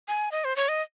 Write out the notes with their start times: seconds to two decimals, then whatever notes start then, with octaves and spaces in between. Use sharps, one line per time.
0.08 G#5
0.32 D#5
0.44 C5
0.56 C#5
0.69 D#5